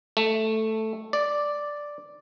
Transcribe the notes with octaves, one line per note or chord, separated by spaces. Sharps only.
A3
D5